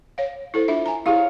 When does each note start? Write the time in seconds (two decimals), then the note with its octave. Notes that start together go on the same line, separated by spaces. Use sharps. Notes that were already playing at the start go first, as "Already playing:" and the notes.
0.18 C#5 F5
0.54 E4 A4 C5
0.68 D4 F4 E5
0.86 G#5 A#5
1.06 E4 G4 G#4 C#5 F5